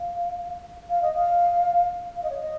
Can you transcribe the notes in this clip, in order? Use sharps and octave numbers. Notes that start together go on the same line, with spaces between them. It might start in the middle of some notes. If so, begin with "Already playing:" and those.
Already playing: F5
F5
D#5
F5
F5
D#5
C#5
D#5